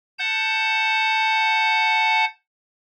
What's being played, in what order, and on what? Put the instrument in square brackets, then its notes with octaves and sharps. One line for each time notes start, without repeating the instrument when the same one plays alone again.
[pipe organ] F#5 A5 G6